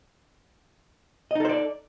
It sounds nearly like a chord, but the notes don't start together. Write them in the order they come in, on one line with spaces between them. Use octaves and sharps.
D#5 D#4 A4 C5 D5